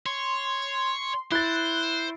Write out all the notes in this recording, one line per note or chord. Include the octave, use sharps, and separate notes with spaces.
C#5 C6
E4 C5 F#6 A6